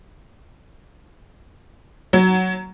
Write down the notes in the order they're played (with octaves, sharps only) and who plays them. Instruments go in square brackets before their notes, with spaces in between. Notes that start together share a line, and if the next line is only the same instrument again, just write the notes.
[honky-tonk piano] F#3